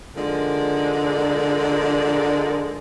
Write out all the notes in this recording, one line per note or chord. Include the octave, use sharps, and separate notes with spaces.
D3 F3 G#3 D#4 A#4 D5